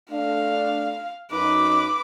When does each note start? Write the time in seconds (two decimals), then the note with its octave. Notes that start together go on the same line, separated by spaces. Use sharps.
0.11 A3 D4 F5
1.32 F#2 D#4 B4 D6